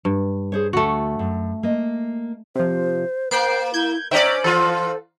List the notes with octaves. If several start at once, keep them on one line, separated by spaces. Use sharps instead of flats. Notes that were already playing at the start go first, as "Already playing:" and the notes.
G2
G#4 C5 C#5
D2 A3 F#4
F#2
A#3 D#5
C3 F3 C5
A#3 C5 G5 C7 D7
E4 G6 G#6
D#3 C#4 C5 D5 E5 G5 A#5
E3 F4 A4